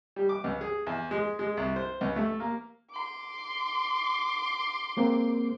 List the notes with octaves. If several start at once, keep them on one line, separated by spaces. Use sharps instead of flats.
G3
D6
C#2
G#4
E2
G#3
G#3
C2
C5
C#2
A3
A#3
C6 D6
G#3 A#3 C4